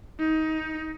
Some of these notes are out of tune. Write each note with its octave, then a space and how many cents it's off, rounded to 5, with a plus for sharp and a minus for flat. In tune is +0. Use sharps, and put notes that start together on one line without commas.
D#4 +20